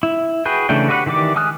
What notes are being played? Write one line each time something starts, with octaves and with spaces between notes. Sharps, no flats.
E4
F#4 G#4 B4 G5
C#3 E3 A3 D4 G5
F#4 G4 B4 E5 F#5
D#3 E3 G4 D5 D6
G#3 G#5 D#6 F6 F#6